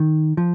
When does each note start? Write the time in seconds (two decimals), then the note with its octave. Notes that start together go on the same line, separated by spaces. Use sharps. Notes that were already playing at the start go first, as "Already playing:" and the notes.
Already playing: D#3
0.37 F3